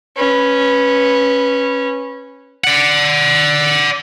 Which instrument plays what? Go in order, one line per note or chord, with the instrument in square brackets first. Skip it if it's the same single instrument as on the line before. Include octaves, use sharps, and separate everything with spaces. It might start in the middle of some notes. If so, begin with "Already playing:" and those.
[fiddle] C#4 B4
[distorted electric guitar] D5 F#5